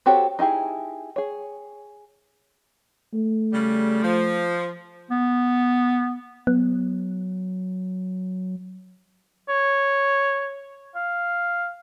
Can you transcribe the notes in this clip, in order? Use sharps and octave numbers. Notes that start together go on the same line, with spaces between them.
C4 F#4 G4 A4 C#5
D#4 E4 G4 G#4
G#4 C#5
A3
C#3 G3
F3
B3
F#3 B3
C#5
F5